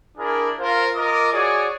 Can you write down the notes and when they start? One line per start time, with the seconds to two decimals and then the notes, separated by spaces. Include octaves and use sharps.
0.18 D4 E4 G#4 A#4
0.59 F4 A#4 C5 F5
0.96 F4 A#4 D#5 D6
1.33 F#4 G#4 C#5 D5 G#5